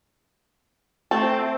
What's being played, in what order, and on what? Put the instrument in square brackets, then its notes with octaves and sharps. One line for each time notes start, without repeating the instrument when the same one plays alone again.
[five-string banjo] A3 [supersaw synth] C4 [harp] A5